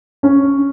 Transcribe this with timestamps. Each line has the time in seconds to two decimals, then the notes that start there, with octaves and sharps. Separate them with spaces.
0.23 C#4